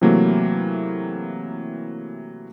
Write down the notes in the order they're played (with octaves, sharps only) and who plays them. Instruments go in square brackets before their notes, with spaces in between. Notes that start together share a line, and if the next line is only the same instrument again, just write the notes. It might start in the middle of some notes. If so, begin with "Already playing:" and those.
[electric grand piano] C3 E3 F#3 A3 A#3